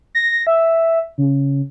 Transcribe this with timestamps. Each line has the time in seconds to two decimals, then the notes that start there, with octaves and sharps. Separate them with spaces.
0.15 A#6
0.47 E5
1.18 C#3